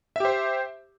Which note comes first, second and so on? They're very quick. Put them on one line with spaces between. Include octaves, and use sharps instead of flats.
E5 G4 C5